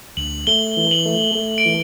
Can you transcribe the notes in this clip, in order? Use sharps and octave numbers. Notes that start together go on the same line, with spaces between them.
D2 F#7
A3 G7
E3
F#7
A3
A3
D7
E3